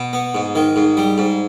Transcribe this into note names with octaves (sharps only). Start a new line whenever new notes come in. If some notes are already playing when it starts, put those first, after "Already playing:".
Already playing: B2
B3
G#2
D#3
G#2
G3
G#2